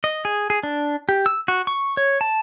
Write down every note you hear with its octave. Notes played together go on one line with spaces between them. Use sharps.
D#5
G#4
G#4
D4
G4
E6
F#4
C#6
C#5
A5